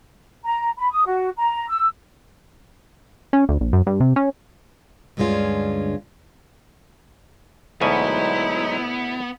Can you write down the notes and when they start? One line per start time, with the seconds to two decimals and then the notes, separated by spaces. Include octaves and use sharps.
0.44 A#5
0.77 B5
0.91 D#6
1.05 F#4
1.37 A#5
1.69 E6
3.33 C#4
3.49 D2
3.60 A#1
3.73 F#2
3.87 G2
4.00 C3
4.16 C#4
5.17 D2 G2 D3 G#3 C#4 F4
7.81 D2 B2 F#3 G#3 B3 D#4 E4 G#5